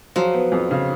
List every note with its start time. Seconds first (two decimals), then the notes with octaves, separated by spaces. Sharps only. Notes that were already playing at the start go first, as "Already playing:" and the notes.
0.16 F3 F#3
0.34 B3
0.52 F2
0.71 C#3